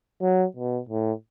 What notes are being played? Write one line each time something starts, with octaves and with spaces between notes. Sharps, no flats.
F#3
B2
A2